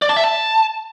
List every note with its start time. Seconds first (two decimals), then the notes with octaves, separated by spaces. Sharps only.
0.02 D5
0.09 A5
0.17 E5
0.24 A5